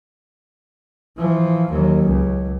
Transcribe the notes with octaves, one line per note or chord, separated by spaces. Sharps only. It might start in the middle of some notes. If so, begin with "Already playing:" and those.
E3 F3
D#2 F#3
C#2